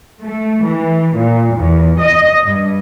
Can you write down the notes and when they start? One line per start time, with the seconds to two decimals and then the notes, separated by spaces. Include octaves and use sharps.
0.23 A3
0.65 E3
1.15 A#2
1.56 E2
2.00 D#5
2.46 G2